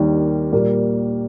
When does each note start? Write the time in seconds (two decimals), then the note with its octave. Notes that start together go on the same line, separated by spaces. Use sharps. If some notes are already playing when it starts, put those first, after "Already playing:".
Already playing: D#2 D#3 G3
0.52 A#2 G3 A#3